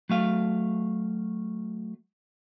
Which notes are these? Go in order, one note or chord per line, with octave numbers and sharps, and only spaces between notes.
F#3 A3 F5